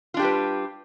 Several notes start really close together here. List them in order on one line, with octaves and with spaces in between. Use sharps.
F4 D4 G4 G3 B4